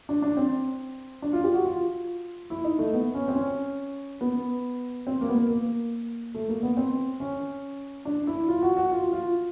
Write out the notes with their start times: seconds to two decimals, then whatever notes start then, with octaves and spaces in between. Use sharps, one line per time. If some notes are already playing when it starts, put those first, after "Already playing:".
0.09 D4
0.22 D4
0.37 C4
1.22 D4
1.33 F4
1.44 G4
1.54 F#4
1.65 F4
2.50 E4
2.64 D#4
2.79 A3
2.93 B3
3.14 C#4
3.28 C4
3.36 C#4
4.21 B3
5.07 C4
5.21 A#3
5.29 B3
5.35 A#3
5.49 A#3
6.34 A3
6.49 A#3
6.63 B3
6.77 C4
7.20 C#4
8.05 D4
8.27 E4
8.48 F4
8.62 F#4
8.77 F#4
8.91 F4
9.12 F4